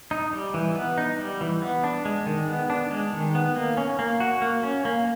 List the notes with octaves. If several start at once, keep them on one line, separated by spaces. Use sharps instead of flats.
D#4
G3
E3
B3
D#4
G3
E3
B3
D4
G#3
D#3
B3
D4
G#3
D#3
B3
A#3
C#4
A#3
F#4
A#3
C#4
A#3